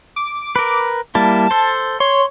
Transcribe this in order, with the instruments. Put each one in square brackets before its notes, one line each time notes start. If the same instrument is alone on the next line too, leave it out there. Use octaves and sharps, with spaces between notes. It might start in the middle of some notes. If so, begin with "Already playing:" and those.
[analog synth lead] D6
[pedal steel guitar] A#4 B4
[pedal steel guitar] G3 A#3 E4 [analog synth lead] A5
[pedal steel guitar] A4 C5
[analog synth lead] C#5 [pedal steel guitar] C6